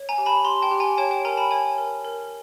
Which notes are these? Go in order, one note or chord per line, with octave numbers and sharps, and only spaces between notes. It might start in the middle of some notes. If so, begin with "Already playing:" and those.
Already playing: C#5
G#5 A#5
G4
A5 B5
G4 A#5 C6
G5 A5
G4
G#5 A#5
C#5 G5 A5
G5 A5
A#4 G#5 A#5
A5 B5
C#5 G#5
A#4
A#4